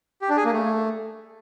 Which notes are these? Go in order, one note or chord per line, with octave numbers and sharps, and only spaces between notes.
G4
D4
G#4
A#3
A3